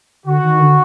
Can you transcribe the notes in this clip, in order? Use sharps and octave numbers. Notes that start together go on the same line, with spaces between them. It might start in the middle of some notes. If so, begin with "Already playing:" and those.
D3 F#4
D#3
D3